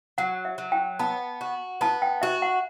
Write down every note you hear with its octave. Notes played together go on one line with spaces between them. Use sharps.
F#3 F#5
E5
F#3
G5
B3 A5
F#4
B3 A5
G5
F#4 E5
F#5